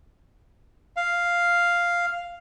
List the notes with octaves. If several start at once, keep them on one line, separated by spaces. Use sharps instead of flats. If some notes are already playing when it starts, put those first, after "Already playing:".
F5